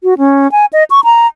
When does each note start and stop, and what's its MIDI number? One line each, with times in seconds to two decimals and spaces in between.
0.04 0.18 66
0.18 0.50 61
0.52 0.66 80
0.73 0.84 75
0.90 1.00 85
1.04 1.27 82